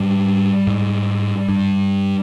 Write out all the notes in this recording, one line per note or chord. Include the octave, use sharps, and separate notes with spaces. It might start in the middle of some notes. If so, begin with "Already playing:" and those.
Already playing: G#2 G3
G#2
G2